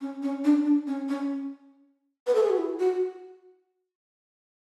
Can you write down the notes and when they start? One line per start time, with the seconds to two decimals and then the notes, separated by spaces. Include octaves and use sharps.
0.01 C#4
0.23 C#4
0.44 D4
0.65 D4
0.87 C#4
1.09 C#4
2.27 B4
2.35 A4
2.43 G#4
2.50 F#4
2.58 E4
2.79 F#4